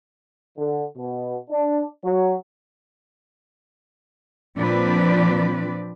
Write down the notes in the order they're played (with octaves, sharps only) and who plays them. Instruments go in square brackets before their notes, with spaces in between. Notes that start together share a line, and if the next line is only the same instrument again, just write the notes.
[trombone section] D3
B2
D4
F#3
[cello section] A#2 F3 C4 D4 B4 D5